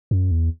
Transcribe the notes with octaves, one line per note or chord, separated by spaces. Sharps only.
F#2
E2